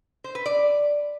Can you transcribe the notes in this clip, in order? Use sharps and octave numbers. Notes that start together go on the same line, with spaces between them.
C5
B4
D5